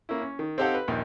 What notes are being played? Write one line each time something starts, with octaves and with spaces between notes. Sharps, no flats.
A#3 C#4 E4
C#4
D#3
C4 D#4 G4 A4 F5 F#5
B4
A#1 D#2